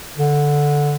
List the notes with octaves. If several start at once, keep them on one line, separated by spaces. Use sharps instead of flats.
D3